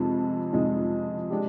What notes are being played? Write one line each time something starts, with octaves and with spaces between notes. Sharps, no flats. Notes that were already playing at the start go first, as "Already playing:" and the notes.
Already playing: F2 C3 F3 G#3 D#4
F2 C3 F3 G#3 D#4
G#3 D4 G4